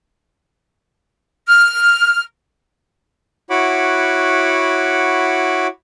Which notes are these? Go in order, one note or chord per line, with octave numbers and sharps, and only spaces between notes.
F6
E4 F#4 C#5 F#5 B5 D6